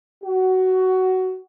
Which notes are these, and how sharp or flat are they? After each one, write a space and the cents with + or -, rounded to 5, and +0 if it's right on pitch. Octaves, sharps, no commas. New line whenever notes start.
F#4 +15